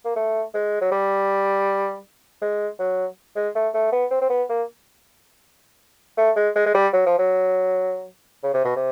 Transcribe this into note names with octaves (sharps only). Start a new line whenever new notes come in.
A#3
A3
G#3
F#3
G3
G#3
F#3
G#3
A3
A3
B3
C4
C4
B3
A#3
A3
G#3
G#3
G#3
G3
F#3
F3
F#3
C#3
C3
B2
C3